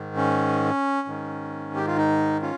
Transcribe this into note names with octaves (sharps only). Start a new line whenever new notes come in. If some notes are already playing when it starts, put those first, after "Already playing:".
Already playing: G#2 D#3
C#4
G#2 D#3
G4
F4
D#4
C#4 F4